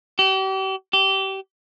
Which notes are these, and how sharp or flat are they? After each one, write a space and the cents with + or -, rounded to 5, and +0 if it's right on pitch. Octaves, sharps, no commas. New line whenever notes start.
G4 -40
G4 -25